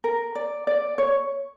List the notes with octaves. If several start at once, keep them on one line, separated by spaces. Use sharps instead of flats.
A#4
D5
D5
C#5